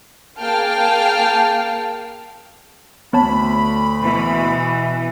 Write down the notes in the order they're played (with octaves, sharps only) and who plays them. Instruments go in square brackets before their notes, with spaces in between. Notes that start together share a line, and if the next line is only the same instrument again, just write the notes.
[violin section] A#3 G#4 F5 G5 A5 F6
[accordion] D2 B5 [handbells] B3 C#5 A5
[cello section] B2 E3